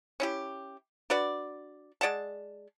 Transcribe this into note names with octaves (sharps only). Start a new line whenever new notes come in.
C#4 E4 G4
D4 F#4 B4 D5
G#3 D5 F#5 A5